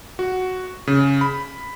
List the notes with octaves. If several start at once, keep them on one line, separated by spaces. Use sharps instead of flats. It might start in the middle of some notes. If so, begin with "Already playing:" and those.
F#4
C#3
B5